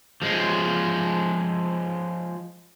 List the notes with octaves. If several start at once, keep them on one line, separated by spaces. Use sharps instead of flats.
F3 G#3